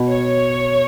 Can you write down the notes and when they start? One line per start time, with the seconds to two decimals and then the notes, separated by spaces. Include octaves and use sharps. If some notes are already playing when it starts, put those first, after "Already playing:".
Already playing: B2
0.08 C#5